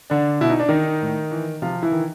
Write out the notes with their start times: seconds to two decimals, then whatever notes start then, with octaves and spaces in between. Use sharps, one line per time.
0.10 D3 D4
0.41 B2 E4
0.50 D#4
0.60 D4
0.69 D#3 D#4
1.02 A2
1.32 E3
1.62 C3 F3 F4
1.83 E3 E4
1.92 D#3